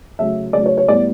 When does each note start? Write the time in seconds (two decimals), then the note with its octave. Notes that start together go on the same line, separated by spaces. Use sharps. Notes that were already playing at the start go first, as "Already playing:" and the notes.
0.19 C#3 F#3 A3 E5
0.53 C#3 F#3 A3 D5
0.66 C#5
0.77 C#5
0.88 A2 G3 B3 D5